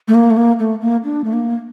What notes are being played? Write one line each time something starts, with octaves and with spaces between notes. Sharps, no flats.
A3
A#3
A3
A#3
A3
A#3
D4
A3
A#3